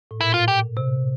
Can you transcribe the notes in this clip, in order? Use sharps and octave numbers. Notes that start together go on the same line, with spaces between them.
A2
A#2 E4
F4
G4
C3